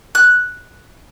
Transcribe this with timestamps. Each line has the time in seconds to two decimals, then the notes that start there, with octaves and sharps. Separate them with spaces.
0.15 F#6